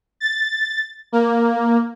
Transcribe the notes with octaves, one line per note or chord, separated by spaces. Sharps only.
A6
A#3